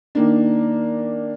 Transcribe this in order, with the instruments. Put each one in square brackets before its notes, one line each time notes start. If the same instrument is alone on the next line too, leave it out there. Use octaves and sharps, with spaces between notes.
[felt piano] D#3 A#3 D4